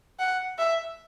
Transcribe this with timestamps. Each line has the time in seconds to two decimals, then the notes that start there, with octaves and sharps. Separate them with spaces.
0.19 F#5
0.58 E5